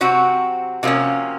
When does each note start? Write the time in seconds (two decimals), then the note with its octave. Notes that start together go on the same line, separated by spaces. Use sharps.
0.01 C3 F#3 C4 F#4
0.83 C3 F3 A#3 C#4